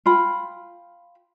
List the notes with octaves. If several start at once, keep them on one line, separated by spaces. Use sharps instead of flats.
F4 G5 B5